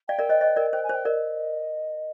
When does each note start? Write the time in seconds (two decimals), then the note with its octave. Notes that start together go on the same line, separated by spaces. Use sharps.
0.08 D5 F5 G5
0.19 A#4 D5
0.29 C5 D#5
0.41 C5 D#5
0.56 A#4 D5
0.73 C5 G5
0.84 G#5
0.89 C5
0.94 G5
1.05 A#4 D5 D#5